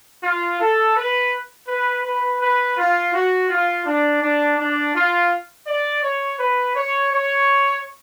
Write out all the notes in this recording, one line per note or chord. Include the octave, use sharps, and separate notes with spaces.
F4
A4
B4
B4
B4
B4
F4
F#4
F4
D4
D4
D4
F4
D5
C#5
B4
C#5
C#5